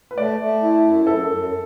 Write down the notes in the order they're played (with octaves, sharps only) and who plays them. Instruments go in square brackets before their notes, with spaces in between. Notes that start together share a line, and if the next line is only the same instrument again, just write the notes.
[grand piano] B4
[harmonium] A3 [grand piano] D5
[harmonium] A3
E4
F#2
[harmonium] F#2 [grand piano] A4
[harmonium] F#2